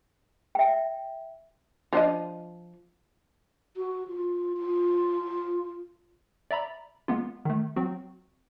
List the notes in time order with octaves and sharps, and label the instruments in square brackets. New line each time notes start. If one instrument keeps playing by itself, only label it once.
[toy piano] E5 G5
[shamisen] F3 D4 D#5
[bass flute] F#4
F4
F4
[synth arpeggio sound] D5 E5 A#5 B5
G#3 A#3 B3 F4
D#3 A3
F#3 C4 F#4